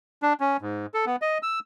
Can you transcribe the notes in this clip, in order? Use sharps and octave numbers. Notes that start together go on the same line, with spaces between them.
D4
C#4
G#2
A4
B3
D#5
E6